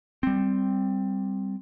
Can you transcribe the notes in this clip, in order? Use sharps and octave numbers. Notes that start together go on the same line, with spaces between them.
G3 C4